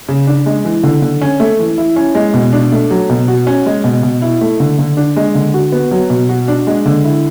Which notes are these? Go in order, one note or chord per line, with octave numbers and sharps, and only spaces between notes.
C#3
D4
G#3
E3
D3
D3
C#4
A3
E3
E4
C#4
G#3
B2
D4
A3
F#3
B2
F#4
C#4
G#3
B2
B2
E4
A3
D3
D3
D4
G#3
D3
F#4
B3
F#3
B2
F#4
D4
G#3
D3
E4